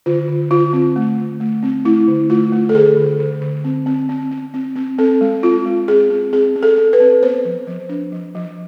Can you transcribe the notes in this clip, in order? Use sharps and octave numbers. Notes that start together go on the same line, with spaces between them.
D3 F4
D3
D3 F4
C4
A3
D3
A3
C4
A3 E4
D3
A3 F4
A3
A4
D3 G#4
D3
D3
D3
C4
C4
C4
C4
C4
C4
C4 A4
G#3
C4 F4
G#3
C4 G#4
C4
C4 G#4
C4
A4
C4
B4
C4
B3 C5
F3
F3
D4
F3
F3